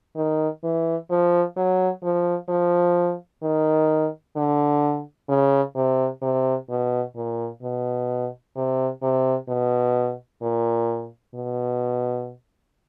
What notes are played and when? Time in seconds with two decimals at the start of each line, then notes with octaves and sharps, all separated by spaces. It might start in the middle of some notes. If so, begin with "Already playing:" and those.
0.16 D#3
0.63 E3
1.10 F3
1.56 F#3
2.03 F3
2.49 F3
3.42 D#3
4.36 D3
5.29 C#3
5.75 C3
6.22 C3
6.69 B2
7.15 A#2
7.62 B2
8.56 C3
9.02 C3
9.48 B2
10.42 A#2
11.35 B2